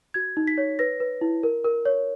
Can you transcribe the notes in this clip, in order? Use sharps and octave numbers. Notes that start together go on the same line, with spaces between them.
F#4 G#6
D#4
B6
C#5
B4 A#6
B4
E4
A#4
A#4
C#5